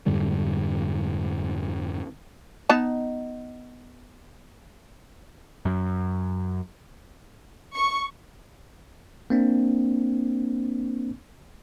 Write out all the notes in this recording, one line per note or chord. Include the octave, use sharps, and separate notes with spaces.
F2 G#2 D3 G3
B3 D#4 A5
F#2
C#6
A#3 C4 D4